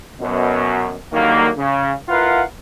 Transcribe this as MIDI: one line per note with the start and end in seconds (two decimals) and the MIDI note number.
0.20 0.94 42
0.20 0.94 47
1.13 1.48 50
1.13 1.48 51
1.13 1.48 54
1.13 1.48 55
1.13 1.48 58
1.57 1.93 49
2.09 2.42 64
2.09 2.42 65
2.09 2.42 70
2.09 2.42 71
2.09 2.42 77
2.09 2.42 78